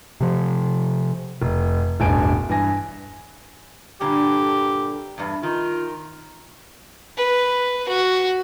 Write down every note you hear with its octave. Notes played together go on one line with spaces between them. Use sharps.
C3 F3
F1
E1 A1 G2 G#5 A5 D7
G2 E3 G#5 A#6
G2 A#2 D3 G4
E2 G2
D#3 F4
B4
F#4